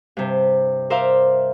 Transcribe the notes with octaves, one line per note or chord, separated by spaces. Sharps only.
G2 C3
A#4 C5 D5 E5 F5